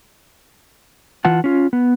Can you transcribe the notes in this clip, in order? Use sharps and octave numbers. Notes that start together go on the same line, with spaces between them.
E3 F4 F#5 A5
C#4 F4
B3